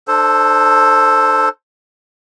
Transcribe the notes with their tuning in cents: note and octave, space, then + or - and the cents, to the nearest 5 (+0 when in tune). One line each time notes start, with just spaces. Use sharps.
D4 +35 A4 +0 C5 +10